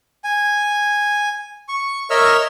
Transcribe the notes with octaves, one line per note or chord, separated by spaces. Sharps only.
G#5
C#6
A#4 C#5 D#5 E5 E6 F6